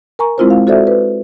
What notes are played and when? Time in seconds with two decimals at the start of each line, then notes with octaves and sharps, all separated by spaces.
0.19 A#4 G#5 A#5 C#6
0.38 G#3 C4 E4 F4 A#4 C5
0.50 F5
0.67 F#4 A4 C5 D5 E5
0.87 B4